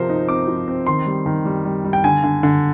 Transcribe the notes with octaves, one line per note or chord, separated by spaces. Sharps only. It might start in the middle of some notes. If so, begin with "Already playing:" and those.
Already playing: C3 F3 A#4 C5
D#4
C4 D6
F3
C4
D#3 C6
G3
D#3
G3
G3
G3
G5
D3 G#5
D3
D3